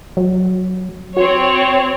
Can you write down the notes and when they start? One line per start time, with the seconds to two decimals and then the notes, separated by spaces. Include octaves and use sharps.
0.17 F#3
1.17 C4 F#4 C#5